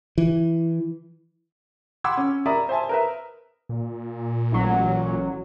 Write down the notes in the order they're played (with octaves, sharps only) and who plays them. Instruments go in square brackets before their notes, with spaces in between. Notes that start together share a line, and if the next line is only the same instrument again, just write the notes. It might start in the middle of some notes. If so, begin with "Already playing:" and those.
[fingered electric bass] E3
[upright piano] F#5 B5 C6 D6 E6 G#6
C#4
A#4 D5 E5 A#5 B5 D#6
C5 E5 G#5 A5
A#4 B4 E5
[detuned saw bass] A#2
[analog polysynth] A1 F#3